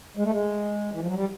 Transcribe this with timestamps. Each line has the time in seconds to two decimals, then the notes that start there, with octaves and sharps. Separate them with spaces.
0.17 G#3
0.24 A3
0.32 G#3
0.93 E3
1.00 F3
1.07 F#3
1.14 G3